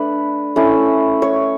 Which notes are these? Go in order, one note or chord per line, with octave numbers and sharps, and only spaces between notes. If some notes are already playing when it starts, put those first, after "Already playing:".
Already playing: A3 D4 B4
A3 C#4 E4
C#5